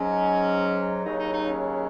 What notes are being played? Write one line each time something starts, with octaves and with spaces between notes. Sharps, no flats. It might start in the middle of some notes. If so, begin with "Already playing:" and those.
Already playing: G#2 F#3 C#4
D#2 C#3 F#3 D#4
D#4
D#4
C#4